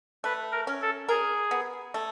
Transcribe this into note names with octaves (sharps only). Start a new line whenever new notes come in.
A3 B4
A#4
C#4
A4
G#4 A#4
B3
A3